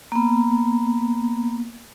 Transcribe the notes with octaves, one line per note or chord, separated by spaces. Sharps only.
A#3 B3